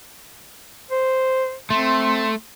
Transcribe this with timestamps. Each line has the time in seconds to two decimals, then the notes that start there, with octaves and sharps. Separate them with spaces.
0.91 C5
1.70 A3 C4 C6